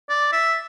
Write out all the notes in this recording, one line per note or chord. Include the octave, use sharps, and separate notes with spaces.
D5
E5